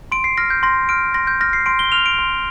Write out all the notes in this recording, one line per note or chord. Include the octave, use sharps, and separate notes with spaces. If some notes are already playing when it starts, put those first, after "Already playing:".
C6 D7
C7
F6 A#6
G6
C6 A#6
F6 D7
C6 A#6
G6
F6 A#6
C7
C6 D7
G7
F6 F7
D7
C6